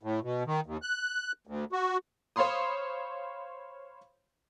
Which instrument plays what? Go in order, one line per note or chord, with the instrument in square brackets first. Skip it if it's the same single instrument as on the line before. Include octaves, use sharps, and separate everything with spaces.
[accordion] A2
B2
D#3
D#2
F#6
D2
F#4
[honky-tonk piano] C5 C#5 F5 B5 C6 D#6